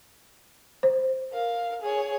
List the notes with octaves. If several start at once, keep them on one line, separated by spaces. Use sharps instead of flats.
C5
A#4 F5
G#4 C#5